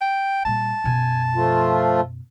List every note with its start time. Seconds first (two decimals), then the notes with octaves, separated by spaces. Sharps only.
0.01 G5
0.45 A#2 G3 A5
0.84 F#2 B2 G#5
1.36 F3 A3 F4